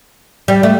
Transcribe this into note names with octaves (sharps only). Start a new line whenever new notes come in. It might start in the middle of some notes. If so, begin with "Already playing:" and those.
G3
A3